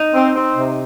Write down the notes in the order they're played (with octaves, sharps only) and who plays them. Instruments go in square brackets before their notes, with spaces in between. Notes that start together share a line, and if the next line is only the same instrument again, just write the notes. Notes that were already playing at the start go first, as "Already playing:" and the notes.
Already playing: [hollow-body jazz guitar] D#4
[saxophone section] C4
C4
C3